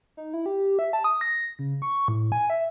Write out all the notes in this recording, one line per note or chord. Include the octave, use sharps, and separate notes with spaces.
D#4
E4
G4
E5
A5
D#6
A#6
C#3
C#6
A2
G#5
E5